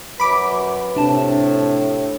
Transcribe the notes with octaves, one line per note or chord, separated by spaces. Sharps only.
F#2 B4 B5 D6
A2 C3 D4 A5